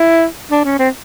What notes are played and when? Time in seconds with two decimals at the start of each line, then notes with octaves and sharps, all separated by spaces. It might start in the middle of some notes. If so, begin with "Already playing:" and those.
Already playing: E4
0.51 D4
0.65 C#4
0.79 C4